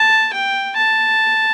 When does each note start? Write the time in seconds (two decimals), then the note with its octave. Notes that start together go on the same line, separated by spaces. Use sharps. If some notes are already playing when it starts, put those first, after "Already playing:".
Already playing: A5
0.33 G5
0.76 A5